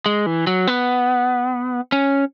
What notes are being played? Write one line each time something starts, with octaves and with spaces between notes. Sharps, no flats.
G#3
E3
F#3
B3
C#4